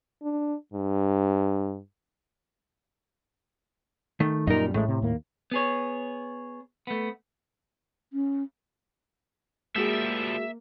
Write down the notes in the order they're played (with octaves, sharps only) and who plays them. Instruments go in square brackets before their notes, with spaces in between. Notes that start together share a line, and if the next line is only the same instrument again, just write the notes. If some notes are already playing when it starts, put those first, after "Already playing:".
[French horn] D4
G2
[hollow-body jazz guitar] D#3 A3
[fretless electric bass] F#2 A#2 G3 [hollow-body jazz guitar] D#4 A#4
[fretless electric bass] A1 G#3 A3 [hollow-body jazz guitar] A2
[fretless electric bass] C3
D#2 A#3
[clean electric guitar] B3 G#4 C#5
A3 B3
[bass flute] C#4
[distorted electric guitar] F3 G3 [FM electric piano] G#3 F#4 G#4 [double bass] A#3 [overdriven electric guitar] E5